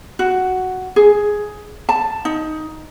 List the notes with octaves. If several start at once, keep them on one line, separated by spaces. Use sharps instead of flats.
F#4
G#4
A5
D#4